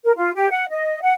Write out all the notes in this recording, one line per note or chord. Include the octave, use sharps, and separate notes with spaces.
A#4
F4
G4
F#5
D#5
F#5